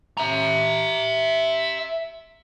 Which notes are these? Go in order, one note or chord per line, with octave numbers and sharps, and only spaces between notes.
E5 A#5